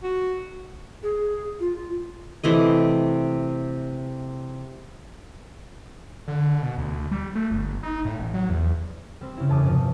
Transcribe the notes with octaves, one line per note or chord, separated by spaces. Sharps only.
F#4
G#4
F4
C3 E3 A3 D#5
D3
B2
D2
G3
A3
G1
D#4
A2
A1
F#3
E2
G3 C4
C#3 E4
E1 C#4 A5 D6 D#6
G1 C3 F3